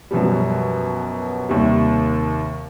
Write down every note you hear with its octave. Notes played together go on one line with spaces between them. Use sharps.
F#2 B2 F3 G3
D#2 C3 D#3 G3